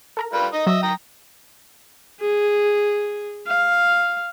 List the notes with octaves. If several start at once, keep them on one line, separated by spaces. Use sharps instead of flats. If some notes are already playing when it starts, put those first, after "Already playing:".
A4 A#4 A#5
G3 F4 B4
D#4 D#5
F#3 D#5 E5
G5 A#5 D#6
G#4
F5